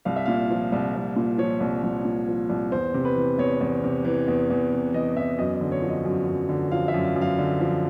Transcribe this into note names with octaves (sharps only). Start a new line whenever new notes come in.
C2 F5
E5
A#2 F5
F3
C2
C2
A#2
F3 C#5
C2
C2
A#2
F3
C2
E2 C5
C3
B4
E3
E2 C#5
E2
C3
E3
E2
E2
C3
E3 D#5
E2 E5
F#2 D#5
D#5
D3
C#5
F3
D#5
F#2
F#2
D3
F3 F5
E5
F#2
F5
F#2
F5
D3
F3